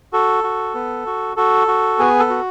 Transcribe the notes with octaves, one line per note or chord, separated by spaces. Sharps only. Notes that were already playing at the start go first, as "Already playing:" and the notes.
F#4 A4
F#4
B3
F#4
F#4 A4
F#4
B3 G#4
A4
F#4